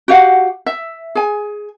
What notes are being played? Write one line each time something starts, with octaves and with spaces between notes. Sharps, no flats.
F#4 G4 F5 F#5
E5
G#4 G#5